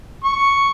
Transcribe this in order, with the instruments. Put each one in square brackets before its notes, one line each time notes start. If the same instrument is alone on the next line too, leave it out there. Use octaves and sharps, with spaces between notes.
[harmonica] C#6